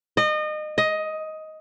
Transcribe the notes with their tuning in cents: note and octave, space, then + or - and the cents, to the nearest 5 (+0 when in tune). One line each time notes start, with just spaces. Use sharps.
D#5 -30
D#5 +10